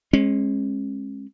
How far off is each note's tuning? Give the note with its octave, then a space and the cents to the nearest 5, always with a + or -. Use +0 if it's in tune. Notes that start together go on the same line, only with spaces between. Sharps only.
G#3 +0 C#4 -40